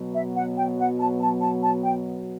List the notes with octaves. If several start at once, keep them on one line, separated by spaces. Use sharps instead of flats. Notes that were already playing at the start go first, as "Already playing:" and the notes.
Already playing: B2 F#3 B3
E5
F#5
G5
F#5
A5
A5
A5
A5
G5